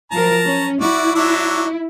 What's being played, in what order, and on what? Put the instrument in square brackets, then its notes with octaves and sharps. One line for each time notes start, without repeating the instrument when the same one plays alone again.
[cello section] F3 F#3 A#4 [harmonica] A5 A#5
[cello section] C#4
[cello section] E4 [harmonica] F#4 D5
[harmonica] F#3 D4 E5